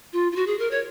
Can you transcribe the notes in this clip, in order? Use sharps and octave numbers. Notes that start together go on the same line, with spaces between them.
F4
F4
F#4
G#4
A#4
C#5